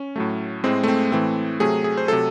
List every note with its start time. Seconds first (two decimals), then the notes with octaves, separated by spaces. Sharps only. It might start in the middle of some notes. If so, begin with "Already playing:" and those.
Already playing: C#4
0.16 A2 F#3 A3
0.64 A2 G#3 C4
0.83 A3
0.88 C4
1.12 A2 E3 A3 C4
1.60 C3 F#3 A3 G#4
1.84 G#4
1.97 C5
2.08 C3 F#3 A3 A4